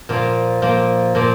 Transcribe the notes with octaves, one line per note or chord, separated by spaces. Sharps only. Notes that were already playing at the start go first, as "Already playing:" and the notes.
A#2 F3 A#3
A#2 F3 A#3
A#2 F3 A#3